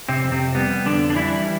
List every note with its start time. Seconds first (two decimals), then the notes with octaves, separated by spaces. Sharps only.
0.09 C3 C4
0.24 F2
0.32 C3 C4
0.55 G3 B3
0.85 F2 D3 D4
1.10 D4
1.16 E3 G3 E4